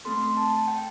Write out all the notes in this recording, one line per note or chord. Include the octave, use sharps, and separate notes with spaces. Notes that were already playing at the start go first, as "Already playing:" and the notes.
A3 C4 A4 C6
A5
G5